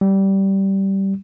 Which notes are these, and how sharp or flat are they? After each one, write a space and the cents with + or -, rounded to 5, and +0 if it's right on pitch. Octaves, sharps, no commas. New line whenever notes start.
G3 -15